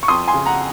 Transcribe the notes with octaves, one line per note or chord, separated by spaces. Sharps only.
C#6
F2 C6 D#6
G#5 C6
C#3
F#5 A#5